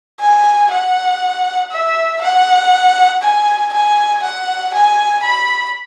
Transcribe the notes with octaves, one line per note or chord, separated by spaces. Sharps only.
G#5
F#5
E5
F#5
G#5
G#5
F#5
G#5
B5